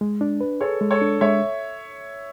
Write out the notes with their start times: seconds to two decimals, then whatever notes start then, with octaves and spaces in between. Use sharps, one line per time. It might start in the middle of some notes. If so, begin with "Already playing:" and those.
0.01 G#3
0.21 D4
0.41 B4
0.61 G#4 A4 C#5
0.81 G#3
0.91 A4 C#5
1.02 D4
1.21 G#3 C#5 E5